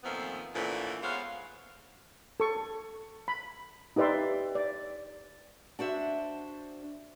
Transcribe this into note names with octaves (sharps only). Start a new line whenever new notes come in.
F2 A#2 D#3 F3 A3 B3
A#2 D3 E3 F3 A3 C#4
G#3 B3 C5 C#5 F5
A4 C#6
B5
D#4 G4 B4 D5 E5 C6
D5
D4 F#4 C5 E5